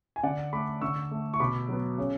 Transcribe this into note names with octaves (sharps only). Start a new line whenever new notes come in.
G#5
D3 D5 F#5
A3 B5 D6
D3 C#6 E6
A3
C#6
B2 B5 D6
F#3 B3
C#3